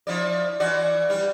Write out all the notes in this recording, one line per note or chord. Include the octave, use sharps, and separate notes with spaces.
F3 E4 D5
E3 F#4 D5
G3